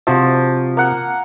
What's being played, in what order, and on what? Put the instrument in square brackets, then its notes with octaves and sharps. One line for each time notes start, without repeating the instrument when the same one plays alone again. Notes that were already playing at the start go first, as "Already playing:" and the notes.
[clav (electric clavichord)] C3 F#4 E5 [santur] F3
[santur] A#3 F#5